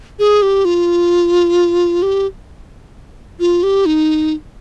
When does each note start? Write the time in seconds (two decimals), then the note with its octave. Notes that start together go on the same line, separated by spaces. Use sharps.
0.19 G#4
0.42 G4
0.65 F4
2.02 G4
3.40 F4
3.63 G4
3.86 D#4